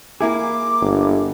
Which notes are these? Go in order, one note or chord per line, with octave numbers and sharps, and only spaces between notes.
A#3 E4 G#4 D6
G1